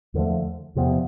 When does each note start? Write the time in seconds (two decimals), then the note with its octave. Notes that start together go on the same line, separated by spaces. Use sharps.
0.14 E2 D3 F3 A3
0.75 E2 C3 F3 B3